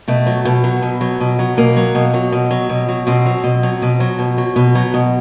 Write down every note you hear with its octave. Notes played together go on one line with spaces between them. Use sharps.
B2 A3
F#3
B2
F#3
B2
F#3
B2
F#3
B2 A#3
F#3
B2
F#3
B2
F#3
B2
F#3
B2 C4
F#3
B2
F#3
B2
F#3
B2
F#3
B2
F#3
B2